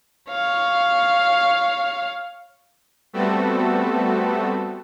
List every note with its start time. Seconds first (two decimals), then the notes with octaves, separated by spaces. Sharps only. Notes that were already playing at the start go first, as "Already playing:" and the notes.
0.31 C#5 F5
3.13 G3 A3 B3 C4 F#4 A4